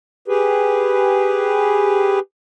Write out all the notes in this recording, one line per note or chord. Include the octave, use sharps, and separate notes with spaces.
G4 G#4 B4